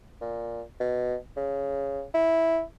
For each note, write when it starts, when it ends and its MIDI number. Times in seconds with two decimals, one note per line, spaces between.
0.21 0.62 46
0.80 1.16 47
1.37 2.03 49
2.14 2.62 64